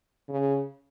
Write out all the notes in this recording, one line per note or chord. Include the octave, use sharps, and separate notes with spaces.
C#3